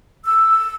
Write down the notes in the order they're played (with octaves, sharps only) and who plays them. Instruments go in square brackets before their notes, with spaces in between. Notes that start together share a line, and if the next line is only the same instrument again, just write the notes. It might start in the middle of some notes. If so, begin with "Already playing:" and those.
[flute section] E6